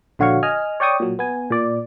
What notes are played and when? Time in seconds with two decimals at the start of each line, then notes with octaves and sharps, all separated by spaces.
0.19 A#1 D3 F#4 C#5 F5 C#6
0.43 D#5 G#5 F6
0.80 C#5 D5 G5 C#6 D#6
1.00 A#2 F#3
1.19 B3 G#5
1.50 A#2 D5